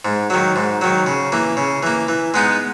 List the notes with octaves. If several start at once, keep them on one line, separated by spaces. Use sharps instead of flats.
G#2
D#3 F#3
G#2
D#3 F#3
C#3
E3 A#3
C#3
E3 A#3
E3
G#3 B3 D#4